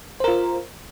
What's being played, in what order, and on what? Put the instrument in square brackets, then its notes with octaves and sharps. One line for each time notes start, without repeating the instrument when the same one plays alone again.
[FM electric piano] C5
A#4
F4